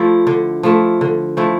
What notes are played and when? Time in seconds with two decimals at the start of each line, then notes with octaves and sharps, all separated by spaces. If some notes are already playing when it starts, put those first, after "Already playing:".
Already playing: F3 A3 E4
0.27 D3
0.63 F3 A3 E4
1.01 D3
1.37 F3 A3 E4